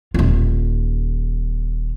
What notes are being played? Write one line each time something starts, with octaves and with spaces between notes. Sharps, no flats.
D#1 F4